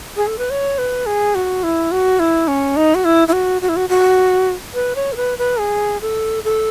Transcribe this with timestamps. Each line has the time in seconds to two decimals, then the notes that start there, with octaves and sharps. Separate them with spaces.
0.16 G#4
0.27 A4
0.38 B4
0.50 C#5
0.78 B4
1.06 G#4
1.35 F#4
1.63 E4
1.92 F#4
2.19 E4
2.48 C#4
2.76 D#4
2.95 F#4
3.05 E4
3.28 E4
3.33 F#4
3.62 F#4
3.69 E4
3.76 F#4
3.89 F#4
4.74 B4
4.96 C#5
5.12 A4
5.17 B4
5.38 B4
5.59 G#4
6.01 A4
6.44 A4